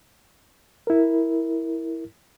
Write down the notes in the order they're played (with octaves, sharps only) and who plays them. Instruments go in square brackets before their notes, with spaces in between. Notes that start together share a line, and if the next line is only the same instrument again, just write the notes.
[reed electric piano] E4 A#4